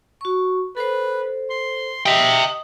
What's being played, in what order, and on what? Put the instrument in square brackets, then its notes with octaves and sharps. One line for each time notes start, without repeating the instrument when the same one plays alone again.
[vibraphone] F#4 C#6
[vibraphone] A4 C5 [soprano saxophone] B4
[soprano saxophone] C6
[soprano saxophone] G4 [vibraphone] D#5 D#6 [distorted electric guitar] E5 G5